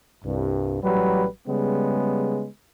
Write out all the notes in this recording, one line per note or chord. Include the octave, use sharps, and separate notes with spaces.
C2 G2
A1 F#3 G3 B4
C#3 G3 G#3 B3